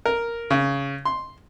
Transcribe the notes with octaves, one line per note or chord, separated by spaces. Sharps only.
A#4
C#3
C6